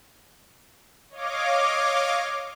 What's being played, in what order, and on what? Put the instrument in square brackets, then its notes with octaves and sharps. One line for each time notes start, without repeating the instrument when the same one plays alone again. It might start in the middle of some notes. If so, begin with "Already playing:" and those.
[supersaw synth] C#5 D#5 F5 D6